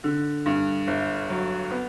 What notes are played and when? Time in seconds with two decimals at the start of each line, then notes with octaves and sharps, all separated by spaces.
0.04 D3
0.46 G2
0.87 G1
1.30 F#3
1.71 B3